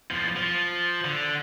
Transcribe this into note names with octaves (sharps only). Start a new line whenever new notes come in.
E2 F3
F3
D3